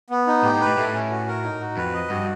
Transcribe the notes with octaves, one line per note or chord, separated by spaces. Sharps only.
B3
D#4
A2 G4
A2
B4
A2
A2 A3
C#4
F#4
A#4
D#4
F#4
F2 B4
D#5
G2 F#4